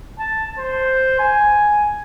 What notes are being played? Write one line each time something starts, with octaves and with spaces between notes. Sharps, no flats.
A5
C5
G#5